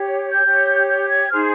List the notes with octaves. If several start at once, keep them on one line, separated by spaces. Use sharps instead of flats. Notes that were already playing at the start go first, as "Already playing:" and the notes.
Already playing: G4 C#5
G6
G4 C#5
G6
G#6
D#4 G#4 C5 F6